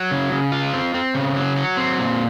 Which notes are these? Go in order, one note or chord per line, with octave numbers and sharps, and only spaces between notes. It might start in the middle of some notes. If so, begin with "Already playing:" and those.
Already playing: F#3
C#3
C#3
F4
C4
C4
C#3
F#3
F#3
C4
A#2